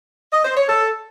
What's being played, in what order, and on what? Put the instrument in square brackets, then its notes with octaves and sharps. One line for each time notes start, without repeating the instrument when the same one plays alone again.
[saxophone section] D#5
C5
C#5
A4